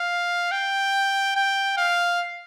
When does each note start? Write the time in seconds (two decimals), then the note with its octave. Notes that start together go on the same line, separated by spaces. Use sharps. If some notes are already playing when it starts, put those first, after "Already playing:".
Already playing: F5
0.52 G5
1.36 G5
1.77 F5